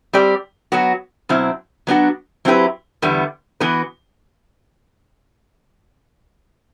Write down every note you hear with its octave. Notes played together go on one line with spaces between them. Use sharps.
G3 C4 G4 D5
F#3 B3 F#4
B2 F#3 C4 E4
F#3 B3 D4 F#4
F#3 C4 E4 G4 B4
E2 D3 G3 B3
E3 B3 F#4 B4